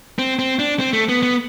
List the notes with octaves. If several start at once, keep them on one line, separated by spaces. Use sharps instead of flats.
C4
C4
D4
C4
A3
B3
B3